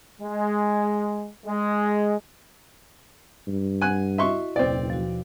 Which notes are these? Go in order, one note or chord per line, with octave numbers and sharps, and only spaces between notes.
G#3
G#3
G2
F#5 G#5 F#6
E4 F#4 D#5 E5 C6 C#6
F#1 D#2 B2 C4 D5 A6
F3 F#4